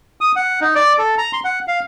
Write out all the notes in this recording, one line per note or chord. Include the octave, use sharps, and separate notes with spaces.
D#6
F#5
D#4
D5
A4
A#5
C6
F#5
F5